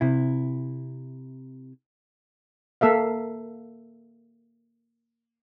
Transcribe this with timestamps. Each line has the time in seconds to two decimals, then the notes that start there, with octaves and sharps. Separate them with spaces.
0.01 C3 E4
2.81 A#3 A4 E5 F5